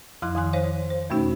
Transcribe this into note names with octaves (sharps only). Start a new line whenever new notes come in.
F2 F3 E4 C6 F#6
F2 D#3 G#5 C6 F#6
C5 C#5 F5
C5
E2 B2 A3 C#4 D#4 F#4